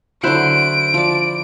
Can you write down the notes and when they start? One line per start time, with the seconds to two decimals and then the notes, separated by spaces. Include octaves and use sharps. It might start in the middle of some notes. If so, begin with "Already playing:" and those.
0.23 D3 F#3 E4 C5 F#6 D7
0.94 F3 D5